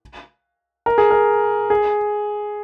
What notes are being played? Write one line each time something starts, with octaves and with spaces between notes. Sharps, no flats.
A#4
G#4
A#4
G#4